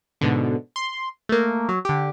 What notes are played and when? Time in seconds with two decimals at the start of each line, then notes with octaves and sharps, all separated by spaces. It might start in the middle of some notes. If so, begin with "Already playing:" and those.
0.21 G#2 B2 D3
0.76 C6
1.29 A3 A#3
1.69 F#3
1.85 D3 G4